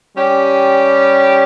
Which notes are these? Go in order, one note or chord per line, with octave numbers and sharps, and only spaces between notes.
G3 C#4 G4